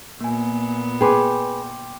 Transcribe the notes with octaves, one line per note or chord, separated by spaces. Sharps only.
A#2 A#3 B3 G#5
G#4 B4 G5 C6 D6